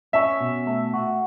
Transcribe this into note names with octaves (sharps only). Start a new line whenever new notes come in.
C#4 E5
B2
A3
F#4